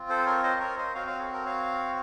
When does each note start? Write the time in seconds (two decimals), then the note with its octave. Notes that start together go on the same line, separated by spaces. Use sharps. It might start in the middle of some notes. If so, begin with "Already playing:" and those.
Already playing: C4 F4
0.10 A4 C5
0.26 A#4 C#5
0.44 C5 D#5
0.60 A#4 C#5
0.78 C5 D#5
0.95 C4 F#4 C#5 F5
1.07 C#5 F5
1.20 A4
1.33 A#4
1.46 C#5 F5